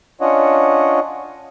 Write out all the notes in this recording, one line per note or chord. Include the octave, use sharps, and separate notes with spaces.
C#4 D4 F4 C#5 D#5 F#5